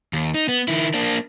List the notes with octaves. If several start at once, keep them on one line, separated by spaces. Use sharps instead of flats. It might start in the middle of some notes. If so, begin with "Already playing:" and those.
D#2
D#4
B3
D#3 E4
A#3 D4